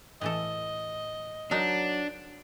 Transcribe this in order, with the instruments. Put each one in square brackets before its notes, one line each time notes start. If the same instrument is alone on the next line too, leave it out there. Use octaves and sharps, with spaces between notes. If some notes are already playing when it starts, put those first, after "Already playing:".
[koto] A2 E3 A4 [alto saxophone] D#5
[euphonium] F#3 [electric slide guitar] D4 [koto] D#4 F#4 A#4